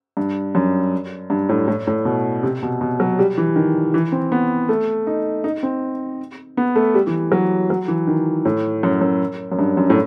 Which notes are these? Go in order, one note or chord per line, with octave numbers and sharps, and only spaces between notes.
G2
F#2
G2
A2
A2
A2
B2
C3
B2
B2
F#3
G3
E3
D#3
E3
C4
B3
A3
D#4
D#4
C4
B3
A3
G3
E3
F#3
F#3
E3
D#3
A2
F#2
F#2
F#2
G2
F#2
A2